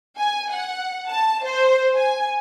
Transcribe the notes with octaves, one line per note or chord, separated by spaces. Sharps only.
G#5
F#5
A5
C5
G#5